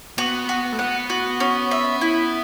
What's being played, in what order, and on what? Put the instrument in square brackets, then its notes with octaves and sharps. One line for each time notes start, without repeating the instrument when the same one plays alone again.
[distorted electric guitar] B3 [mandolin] F#4
[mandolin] F#4
[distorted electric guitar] A3
[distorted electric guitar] B3 [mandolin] F#5
[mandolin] F#4
C#4
E5
E4